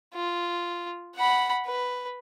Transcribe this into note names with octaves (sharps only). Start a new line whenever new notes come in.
F4
F#5 B5
B4